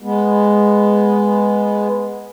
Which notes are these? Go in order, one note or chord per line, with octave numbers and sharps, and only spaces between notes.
G#3 B3